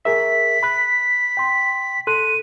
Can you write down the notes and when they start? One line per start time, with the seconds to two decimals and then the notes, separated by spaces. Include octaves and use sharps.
0.05 G#4 A#4 E5 B6
0.63 B5 F#6
1.37 G5 C6
2.07 A4 C6 F#6 D#7